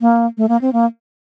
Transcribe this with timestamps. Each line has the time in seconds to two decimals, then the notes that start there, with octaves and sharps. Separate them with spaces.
0.01 A#3
0.38 A3
0.49 A#3
0.61 C4
0.73 A#3